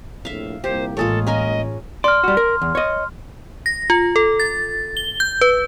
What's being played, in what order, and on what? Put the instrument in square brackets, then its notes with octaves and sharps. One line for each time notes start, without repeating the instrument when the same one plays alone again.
[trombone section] A#1 F2 A2 [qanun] E5 F5
[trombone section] C2 A#2 A#3 [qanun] G4 [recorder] C5
[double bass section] A1 [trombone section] G#3 A#3 [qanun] F4 G#4 C#5 [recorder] A4
[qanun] C#4 A#4 G#5 [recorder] D#5
[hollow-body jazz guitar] D5 [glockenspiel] C6 F6
[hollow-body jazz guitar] G3 F#4
A#4
E2
C#5 D#5
[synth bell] A#6
F4
A4
A6
G7
G6
B4